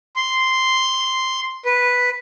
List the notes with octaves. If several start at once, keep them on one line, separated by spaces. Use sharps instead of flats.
C6
B4